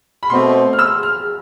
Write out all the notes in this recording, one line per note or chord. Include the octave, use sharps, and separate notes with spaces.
B5
B2 A3 C4 C6
F6
E6
F6